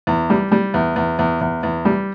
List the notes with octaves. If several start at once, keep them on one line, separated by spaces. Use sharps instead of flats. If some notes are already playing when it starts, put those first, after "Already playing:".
E2
G3
G3
E2
E2
E2
E2
E2
G3